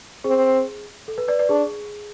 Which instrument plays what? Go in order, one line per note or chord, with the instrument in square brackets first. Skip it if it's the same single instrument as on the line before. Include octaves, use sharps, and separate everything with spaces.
[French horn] C4 [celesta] G#4
[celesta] A4
B4
B4 D5
B4 D5
[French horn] D4 [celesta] G#4